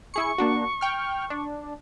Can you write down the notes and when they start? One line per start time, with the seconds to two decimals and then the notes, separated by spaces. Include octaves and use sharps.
0.14 E4 G#4 C#6 C#7
0.38 A#3 D4 F#4
0.81 G5 F6
1.30 D4